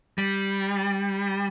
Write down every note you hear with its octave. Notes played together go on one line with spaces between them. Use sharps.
G3